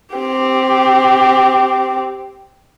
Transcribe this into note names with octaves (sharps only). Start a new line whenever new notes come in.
C4 G4